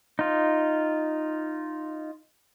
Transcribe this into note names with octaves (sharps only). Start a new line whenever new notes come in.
D#4 F4